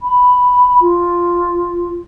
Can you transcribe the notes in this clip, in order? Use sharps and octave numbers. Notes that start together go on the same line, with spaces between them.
B5
F4